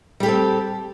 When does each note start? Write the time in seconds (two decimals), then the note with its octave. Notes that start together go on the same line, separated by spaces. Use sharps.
0.20 G3
0.23 G4
0.26 A4
0.28 C4